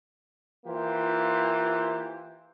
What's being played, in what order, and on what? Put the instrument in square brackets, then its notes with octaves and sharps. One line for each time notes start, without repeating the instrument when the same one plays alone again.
[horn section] E3 A#3 F4 G4 C5